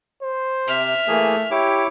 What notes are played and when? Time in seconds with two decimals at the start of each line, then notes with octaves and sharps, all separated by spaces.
0.22 C5
0.68 C3 E5 F6
1.08 E3 A3 A#3 G#4
1.51 E4 G4 C#5 D6